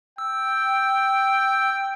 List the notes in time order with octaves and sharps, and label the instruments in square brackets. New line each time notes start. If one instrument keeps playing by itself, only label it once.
[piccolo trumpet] G5 [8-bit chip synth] E6